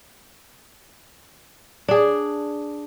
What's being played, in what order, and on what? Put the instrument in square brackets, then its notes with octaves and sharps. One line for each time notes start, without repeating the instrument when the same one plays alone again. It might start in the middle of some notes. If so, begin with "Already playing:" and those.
[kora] D4 G#4